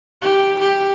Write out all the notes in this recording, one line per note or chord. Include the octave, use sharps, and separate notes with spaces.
G4
G4